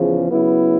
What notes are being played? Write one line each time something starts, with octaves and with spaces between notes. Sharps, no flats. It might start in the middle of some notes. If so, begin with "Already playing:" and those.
Already playing: E2 C#3 F3
C#3 F#3 B3 E4